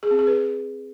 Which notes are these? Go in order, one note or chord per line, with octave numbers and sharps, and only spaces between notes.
G#4
C4
G#4
B4